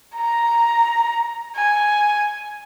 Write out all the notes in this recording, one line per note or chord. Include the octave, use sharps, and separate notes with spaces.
A#5
G#5